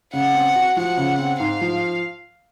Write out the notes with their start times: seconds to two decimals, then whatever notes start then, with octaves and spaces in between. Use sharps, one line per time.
0.13 C#3 F#5
0.35 C4
0.56 F#4
0.77 F3 F#5
0.97 C#3
1.19 C4
1.40 G#2 F5
1.61 F3